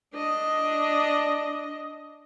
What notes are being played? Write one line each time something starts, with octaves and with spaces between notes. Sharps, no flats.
D4 D#5